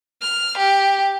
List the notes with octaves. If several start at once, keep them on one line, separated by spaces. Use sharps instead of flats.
F6
G4